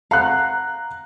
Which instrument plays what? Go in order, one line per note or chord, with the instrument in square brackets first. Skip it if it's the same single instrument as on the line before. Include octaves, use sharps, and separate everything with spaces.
[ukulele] F5 F#5 [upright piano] A#5 F#6